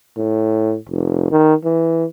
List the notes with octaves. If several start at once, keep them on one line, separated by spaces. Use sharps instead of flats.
A2
F1
D#3
E3